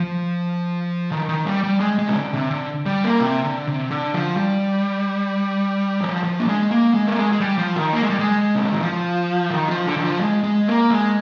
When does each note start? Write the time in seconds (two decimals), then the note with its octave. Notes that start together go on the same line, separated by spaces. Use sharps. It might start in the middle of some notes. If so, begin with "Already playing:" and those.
Already playing: F3
1.11 D#3
1.29 D#3
1.45 G3
1.63 G3
1.80 G#3
1.98 G#3
2.08 C3
2.15 D3
2.33 C3
2.51 D3
2.86 G3
3.04 A#3
3.20 C3
3.44 D3
3.67 C3
3.91 D3
4.14 F3
4.37 G3
6.01 F3
6.24 F3
6.39 A#3
6.47 G#3
6.71 A#3
6.94 G#3
7.06 A#3
7.18 G#3
7.32 G#3
7.40 G3
7.58 F3
7.76 D#3
7.93 A#3
8.02 G#3
8.10 G3
8.19 G#3
8.55 C3
8.64 D3
8.72 D#3
8.80 F3
9.50 D#3
9.68 F3
9.86 D3
9.96 D#3
10.03 F3
10.21 G#3
10.43 G#3
10.68 A#3
10.90 G#3